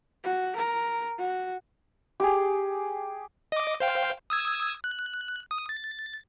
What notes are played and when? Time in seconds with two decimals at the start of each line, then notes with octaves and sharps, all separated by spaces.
0.24 F#4
0.57 A#4
1.19 F#4
2.20 G4 G#4
3.52 D#5 D6
3.80 C5 F5 G5
4.30 D#6 E6 G#6
4.84 F#6
5.51 D#6
5.69 A6